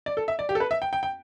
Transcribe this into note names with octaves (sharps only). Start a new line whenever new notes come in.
D5
A4
E5
D5
G4
A4
B4
E5
G5
G5
G5